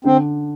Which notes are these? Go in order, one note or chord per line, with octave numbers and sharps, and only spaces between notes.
D3 C4